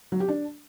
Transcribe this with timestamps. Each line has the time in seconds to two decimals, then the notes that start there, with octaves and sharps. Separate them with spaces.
0.12 F#3
0.20 G4
0.28 D4